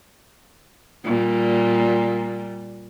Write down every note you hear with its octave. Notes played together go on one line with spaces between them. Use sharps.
A#2 G3